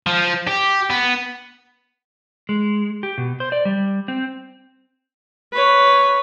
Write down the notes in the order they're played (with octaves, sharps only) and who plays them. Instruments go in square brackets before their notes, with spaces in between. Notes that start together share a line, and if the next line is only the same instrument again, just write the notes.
[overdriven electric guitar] F3
G4
B3
[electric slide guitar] G#3
G4
B2
C5
D5
G3
C4
[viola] B4 C#5